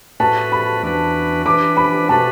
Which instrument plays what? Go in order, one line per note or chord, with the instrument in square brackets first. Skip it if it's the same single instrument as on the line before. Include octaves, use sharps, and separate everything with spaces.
[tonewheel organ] A2 A3 F#4 B4 [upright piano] A5
[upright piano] B5
[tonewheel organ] E2 E3 D4 F#4 B4
[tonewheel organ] E3 D4 B4 [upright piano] D6
[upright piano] B5
[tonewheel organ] B2 A3 F#4 B4 [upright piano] A5